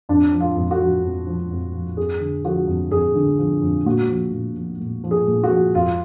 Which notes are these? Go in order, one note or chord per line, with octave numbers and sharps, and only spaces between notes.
F2 D4
F3
F4
F2
F#4
F3
F2
F3
F2
F3
F2 G#4
D3
F3 F#4
F2
F2 G#4
D3
F3
F2
A#2 F#4
F3
A#2
F3
A#2
F3
G#4
A#2
F#4
F3
F2 F4